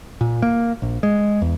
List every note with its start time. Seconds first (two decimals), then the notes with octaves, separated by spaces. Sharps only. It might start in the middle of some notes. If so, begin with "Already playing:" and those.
0.21 A#2
0.42 A#3
0.82 A#1
1.03 G#3
1.42 E2